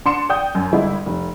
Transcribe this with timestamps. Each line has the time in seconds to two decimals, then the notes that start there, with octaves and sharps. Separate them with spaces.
0.06 D4 C6 C#7 E7
0.29 D5 G5 D#6 G6
0.55 F#2
0.72 G1 G#3 E4
1.06 F1